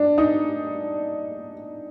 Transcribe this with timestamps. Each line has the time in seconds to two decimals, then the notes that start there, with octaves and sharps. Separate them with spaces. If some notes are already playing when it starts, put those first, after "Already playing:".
Already playing: D4
0.18 D#4